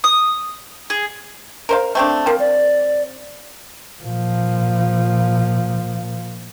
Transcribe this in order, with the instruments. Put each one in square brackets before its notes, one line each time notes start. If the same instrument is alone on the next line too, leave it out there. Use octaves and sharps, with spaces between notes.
[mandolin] D#6
G#4
[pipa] A#4 C5 F5
A3 C4 D4
[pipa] F3 C4 [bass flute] A#4
[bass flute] D5
[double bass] A#2 F3